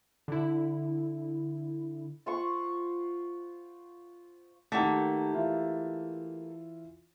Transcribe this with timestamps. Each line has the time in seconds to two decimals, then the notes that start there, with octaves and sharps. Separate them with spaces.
0.28 D3 E4
2.26 F4 C5 F#5 C#6
4.72 D#3 A3 A#3 G4 F#5 A6
5.33 E3 F4 E5